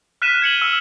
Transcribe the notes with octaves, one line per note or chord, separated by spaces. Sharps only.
F6 F#6 B6 D#7 E7
G#6 C#7 F#7 G7
E6